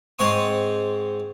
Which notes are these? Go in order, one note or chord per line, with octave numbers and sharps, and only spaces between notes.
G#2 C4 C#5 F#5 C#6 D#6